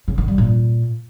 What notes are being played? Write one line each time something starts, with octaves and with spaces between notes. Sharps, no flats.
C#3
D#3
G3
A#2